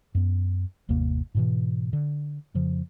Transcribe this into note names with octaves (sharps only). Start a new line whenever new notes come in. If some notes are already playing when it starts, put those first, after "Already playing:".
F#2 B3
G1 D#2 C3 A#3
G#2 B2 E3
D3
F2 C#3 F3